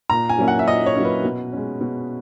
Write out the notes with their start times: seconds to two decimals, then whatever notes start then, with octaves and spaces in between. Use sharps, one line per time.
0.10 A#2 A#5
0.29 G#5
0.39 F#3 A#3 C#4 E4
0.48 F#5
0.59 E5
0.67 A#2 D#5
0.86 C#5
0.96 F#3 A#3 C#4 E4
1.05 B4
1.24 B2
1.53 G#3 C#4
1.81 B2